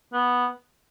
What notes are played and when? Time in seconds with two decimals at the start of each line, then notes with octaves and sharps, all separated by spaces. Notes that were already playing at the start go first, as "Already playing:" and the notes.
0.13 B3